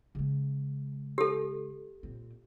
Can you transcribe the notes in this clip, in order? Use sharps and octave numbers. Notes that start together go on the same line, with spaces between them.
C#3 G#3
G4 A4
A#2 C4